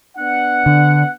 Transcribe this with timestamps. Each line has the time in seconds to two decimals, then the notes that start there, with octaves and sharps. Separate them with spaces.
0.18 B3 D4 F#5
0.66 D3